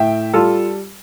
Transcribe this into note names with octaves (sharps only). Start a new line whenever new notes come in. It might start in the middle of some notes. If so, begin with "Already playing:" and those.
Already playing: A2 E5 G5
G3 F4 A4